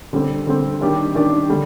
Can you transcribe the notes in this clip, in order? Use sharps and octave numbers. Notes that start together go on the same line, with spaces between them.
D3 G3 C4
D3 G3 C4
D#3 G3 D4 G4
D#3 G3 D4 G4
D3 G3